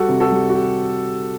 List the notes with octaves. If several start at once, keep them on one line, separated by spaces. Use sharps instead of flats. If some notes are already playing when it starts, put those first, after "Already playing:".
Already playing: G3 F#4 A4
C3
F#4 A4
G3
F#4
G4